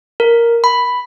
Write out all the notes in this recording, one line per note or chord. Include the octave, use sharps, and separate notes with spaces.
A#4
B5